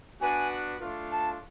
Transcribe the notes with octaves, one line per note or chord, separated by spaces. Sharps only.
B3 D4 F#4 B4 G#5
A3 D4 F4
A5